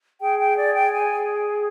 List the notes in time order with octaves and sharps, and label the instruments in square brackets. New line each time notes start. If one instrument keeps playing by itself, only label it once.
[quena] G#4 [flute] G5
[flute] G5
D5
G5
G#5